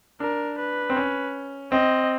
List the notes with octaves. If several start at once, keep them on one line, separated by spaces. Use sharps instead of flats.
D4 A#4
B4
C4
C#4
C4 D#5